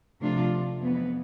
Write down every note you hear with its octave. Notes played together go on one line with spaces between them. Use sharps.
C3 F3 A3 D4 F4
F2 E3 B3